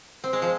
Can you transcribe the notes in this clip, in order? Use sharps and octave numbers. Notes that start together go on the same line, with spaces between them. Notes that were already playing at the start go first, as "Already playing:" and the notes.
C4
G#3
F3